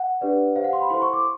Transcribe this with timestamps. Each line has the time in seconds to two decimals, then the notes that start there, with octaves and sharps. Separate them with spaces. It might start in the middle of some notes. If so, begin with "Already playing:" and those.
Already playing: F#5
0.21 D4 G4 B4 D5
0.56 G4 C5 F5
0.64 F#5
0.73 C6
0.81 B5
0.90 E4 A4 C5 C6
1.02 C#6
1.13 D6